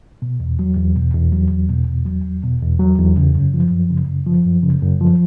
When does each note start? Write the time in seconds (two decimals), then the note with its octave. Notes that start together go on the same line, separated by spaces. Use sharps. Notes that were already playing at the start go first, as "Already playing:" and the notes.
0.22 B2
0.40 E2
0.59 F#3
0.77 E2
0.96 B2
1.14 E2
1.32 F#3
1.51 E2
1.69 B2
1.87 E2
2.06 F#3
2.24 E2
2.43 B2
2.62 E2
2.79 F#3
2.98 E2
3.17 C#3
3.34 F#2
3.54 F3
3.71 F#2
3.90 C#3
4.08 F#2
4.26 F3
4.46 F#2
4.63 C#3
4.82 F#2
5.01 F3